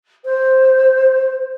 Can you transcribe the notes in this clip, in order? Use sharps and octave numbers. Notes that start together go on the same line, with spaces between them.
C5